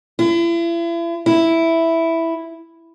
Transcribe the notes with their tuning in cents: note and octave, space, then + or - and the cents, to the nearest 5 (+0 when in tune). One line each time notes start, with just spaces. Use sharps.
E4 +40
E4 +0